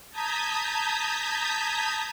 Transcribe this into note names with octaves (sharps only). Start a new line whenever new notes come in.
A5 A#5 D#6 G6 G#6 B6